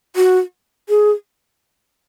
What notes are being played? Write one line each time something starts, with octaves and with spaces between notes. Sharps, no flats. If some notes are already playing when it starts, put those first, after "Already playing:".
F#4
G#4